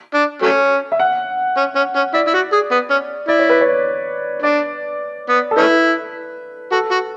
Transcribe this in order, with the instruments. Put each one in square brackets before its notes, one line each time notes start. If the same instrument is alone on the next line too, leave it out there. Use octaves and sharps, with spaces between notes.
[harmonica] D4
F#3 A3 C#4
[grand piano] E5
F#5
[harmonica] C#4
C#4
C#4
[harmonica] E4 [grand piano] D5
[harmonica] E4
F#4
G#4
B3
C#4
[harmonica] E4 [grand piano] D5
[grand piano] C#5
B4
C#5
[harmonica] D4 [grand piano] D5
[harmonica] B3
[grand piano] A4
[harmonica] A3 C#4 E4 [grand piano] B4
[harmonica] F#4 [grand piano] A4
[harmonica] F#4